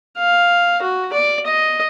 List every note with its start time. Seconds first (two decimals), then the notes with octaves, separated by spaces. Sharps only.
0.18 F5
0.82 F#4
1.13 D5
1.46 D#5